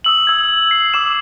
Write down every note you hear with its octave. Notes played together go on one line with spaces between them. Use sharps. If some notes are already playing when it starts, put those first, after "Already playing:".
D#6 E6 F#7
E6 G#6
C7
D6 E6 E7